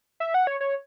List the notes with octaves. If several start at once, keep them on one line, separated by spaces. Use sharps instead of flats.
E5
F#5
C#5
C#5